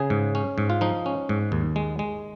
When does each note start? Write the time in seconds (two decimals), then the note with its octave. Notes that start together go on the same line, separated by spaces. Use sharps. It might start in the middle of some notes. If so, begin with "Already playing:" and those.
Already playing: C#3 G#4
0.10 G#2
0.35 C#4
0.58 G#2
0.70 F4
0.81 F3 D#4
1.06 C#4
1.29 G#2
1.52 D#2
1.76 G#3
1.99 G#3